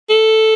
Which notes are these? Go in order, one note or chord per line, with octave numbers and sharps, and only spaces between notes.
A4